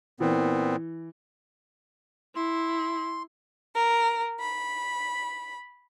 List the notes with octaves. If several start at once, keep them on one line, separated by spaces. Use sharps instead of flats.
A#2 E3 B3 C4
E4 C6
A#4
B5